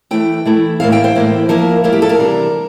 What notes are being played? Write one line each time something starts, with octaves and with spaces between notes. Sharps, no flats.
E3 A3 E4 G5
E3 A3 E4
A2 E3 A#3 E4 F5
G5
C5
A2 E3 A#3 E4
F3 A#3 E4 A#4
F3 A#3 E4 F4
G4
A4
A#4
C3 E3 G3 D4